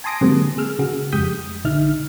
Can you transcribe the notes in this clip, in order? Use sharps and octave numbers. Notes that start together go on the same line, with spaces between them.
G#5 A5 C6 D#6 A#6 D7
D3 F#3 G#3 A#3 C4 G4
G#4 E6 F6
C#3 F#4 G#4
F2 G#3 G4 D#6 G6 B6
A#1 D3 D#4 E5 F6